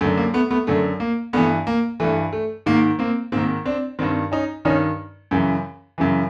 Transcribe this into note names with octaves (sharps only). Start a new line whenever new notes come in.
F#2 D3 A3
A#3
A3 B3
A3 B3
F#2 D3 A3
A#3
G2 E3 A3 B3
A#3
G2 E3 A3
A3
G#2 D#3 A#3
A#3 C4
G#2 D#3 A#3 C4
C4 D4
G2 D#3 C4 D4
C#4 D#4
G2 D#3 C#4 D#4
F#2 C#3 E3
F#2 C#3 E3